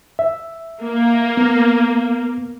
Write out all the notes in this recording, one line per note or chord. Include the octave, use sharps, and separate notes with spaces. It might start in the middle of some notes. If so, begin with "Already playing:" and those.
E5
A#3
B3